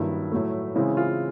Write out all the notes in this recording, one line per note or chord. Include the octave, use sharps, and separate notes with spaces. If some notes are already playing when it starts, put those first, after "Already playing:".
Already playing: G2 D#3 F#3 A#3 E4
A2 F#3 A3
C#3 E3 G#3 C4 E4
F4